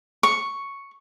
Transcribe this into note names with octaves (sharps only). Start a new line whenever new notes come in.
C#6